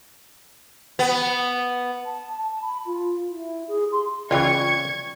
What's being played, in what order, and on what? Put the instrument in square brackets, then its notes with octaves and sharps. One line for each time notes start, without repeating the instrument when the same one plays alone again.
[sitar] B3
[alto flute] A5
A5
B5
F4
E4
G#4
C6
[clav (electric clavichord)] C#2 E3 [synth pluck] C#4 F4 [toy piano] D5 G5 [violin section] C#6 G#6